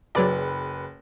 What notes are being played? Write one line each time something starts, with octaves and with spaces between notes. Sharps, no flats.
F#1 F#3 B4 D5